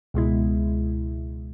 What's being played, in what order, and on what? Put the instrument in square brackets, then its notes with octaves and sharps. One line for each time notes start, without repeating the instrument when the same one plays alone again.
[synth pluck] C#2 B2 G#3 E4